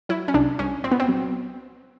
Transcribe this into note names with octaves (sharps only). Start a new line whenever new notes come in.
F#3 E4
C#4
C2 D4
C2 C#4
A#2 C4
B3
C4
F#3